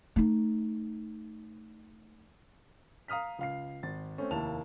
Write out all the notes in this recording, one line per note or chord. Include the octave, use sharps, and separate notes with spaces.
A3 D#4
F5 A#5 D#6 F6 B6
C#2 F5 C7
G#1 A6
A3 C4 C#4
F1 D#2 A#3 E4 A5 F7